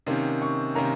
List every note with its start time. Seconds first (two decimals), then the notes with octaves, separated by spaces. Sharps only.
0.07 C3 D#3 A#3 C#4
0.42 C#6
0.75 C3 D#3 A#3 C#4 A#5